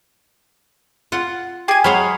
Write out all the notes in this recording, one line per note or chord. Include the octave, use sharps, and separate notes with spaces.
F4 F#5
G4 G#4 G#5
F#3 G#3 G#4 C5 C#5 B5 F6